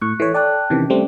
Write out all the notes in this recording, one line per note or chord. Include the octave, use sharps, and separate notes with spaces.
A2 C#6 F#6
E3 A4 C#5
D5 G5 A5 F#6
C3 D#3 E3 C#4
G3 A3 C4 C5